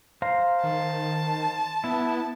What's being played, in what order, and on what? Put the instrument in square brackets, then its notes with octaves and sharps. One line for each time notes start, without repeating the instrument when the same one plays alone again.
[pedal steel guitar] C5 F5 A#5
[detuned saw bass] D#3 [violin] A5
[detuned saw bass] B3 [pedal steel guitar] E4